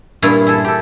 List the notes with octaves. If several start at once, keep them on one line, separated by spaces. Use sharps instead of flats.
G2 A#2 E4 F4 C#5
E4 G#4 A4
G4 A4